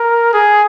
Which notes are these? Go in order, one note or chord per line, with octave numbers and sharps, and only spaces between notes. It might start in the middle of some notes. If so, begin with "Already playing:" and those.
Already playing: A#4
G#4